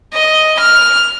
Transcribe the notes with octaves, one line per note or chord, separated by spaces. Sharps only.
D#5
F6